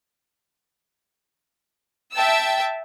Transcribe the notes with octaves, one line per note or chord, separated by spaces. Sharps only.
E5 G5 A5 E6